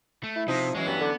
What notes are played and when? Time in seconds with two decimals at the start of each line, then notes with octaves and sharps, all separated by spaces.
0.23 A3
0.36 E4
0.48 C3 F3 D#4 E4
0.75 E3 F#3 G#3 C#4
0.87 G2 B3
1.01 D3